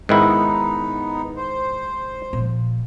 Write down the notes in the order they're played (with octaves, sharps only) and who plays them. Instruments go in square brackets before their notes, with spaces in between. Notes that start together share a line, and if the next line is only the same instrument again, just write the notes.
[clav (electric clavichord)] G#2 D#3 E4 [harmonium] B3 D#4
[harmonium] C5
[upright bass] A#2 F3